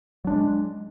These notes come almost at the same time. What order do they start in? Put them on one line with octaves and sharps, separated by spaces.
F#3 D4 G#3